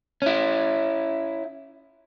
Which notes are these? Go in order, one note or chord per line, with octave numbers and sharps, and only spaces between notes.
C#4 E4